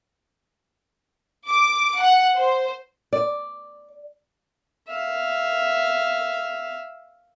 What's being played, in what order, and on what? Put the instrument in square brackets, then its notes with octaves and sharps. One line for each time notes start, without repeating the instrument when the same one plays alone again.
[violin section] D6
F#5
C5
[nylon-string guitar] D5
[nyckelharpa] E5 F5